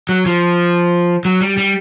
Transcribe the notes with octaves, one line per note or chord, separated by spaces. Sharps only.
F#3
F3
F#3
G3
G3